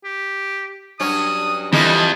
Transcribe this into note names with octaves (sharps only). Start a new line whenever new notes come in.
G4
G2 F#3 C#4 D#6
F2 E3 G3 A#3 G#4 D#5